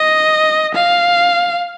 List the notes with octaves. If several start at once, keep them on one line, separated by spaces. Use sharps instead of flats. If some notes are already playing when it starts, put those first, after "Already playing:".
Already playing: D#5
F5